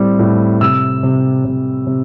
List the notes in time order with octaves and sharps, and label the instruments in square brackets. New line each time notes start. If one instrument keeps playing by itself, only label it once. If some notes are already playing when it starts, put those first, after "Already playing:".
Already playing: [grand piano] A2 G3 C4
A2
C3 E6
C3
C3
C3